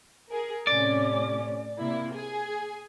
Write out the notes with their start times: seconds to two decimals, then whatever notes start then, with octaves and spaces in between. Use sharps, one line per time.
0.29 G#4 A#4
0.67 A2 C3 C#4 D5
1.79 C3 A#3 E4
2.14 G#4